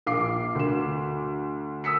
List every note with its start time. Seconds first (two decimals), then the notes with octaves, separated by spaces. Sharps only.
0.06 A#1 F5 D6 C7
0.55 D2 E7
1.84 D#6 E6 B6 C#7